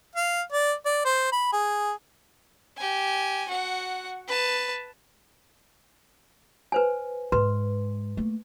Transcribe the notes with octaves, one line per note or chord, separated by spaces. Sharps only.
F5
D5
D5
C5
B5
G#4
G4 G#5
F#4 F#5
B4 A5
B4 C5 G#5
G#2 G#3 B4 C6
A3 A#3